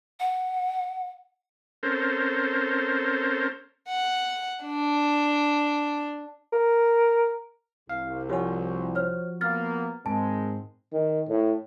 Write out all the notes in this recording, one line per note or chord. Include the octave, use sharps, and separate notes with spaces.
F#5
C4 C#4 A4 A#4 C5
F#5
D4
A#4
C2 F5
F3 F#4 G4 C#5 G#5
C5 C#5 F6
A#3 B3 F6 A6
G#2 D#3 G#3 C4 A5
D#3
A2